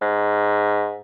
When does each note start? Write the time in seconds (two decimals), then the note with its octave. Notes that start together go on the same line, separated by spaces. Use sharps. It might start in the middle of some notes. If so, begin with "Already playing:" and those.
0.01 G#2